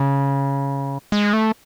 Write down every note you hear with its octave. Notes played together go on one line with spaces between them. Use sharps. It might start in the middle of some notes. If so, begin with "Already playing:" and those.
Already playing: C#3
G#3
A3